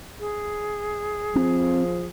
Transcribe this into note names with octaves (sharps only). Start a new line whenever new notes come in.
G#4
F3 C4